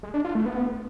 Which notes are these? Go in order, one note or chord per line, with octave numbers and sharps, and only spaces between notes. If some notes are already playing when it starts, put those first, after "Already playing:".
G#3
D4
F4
A3
B3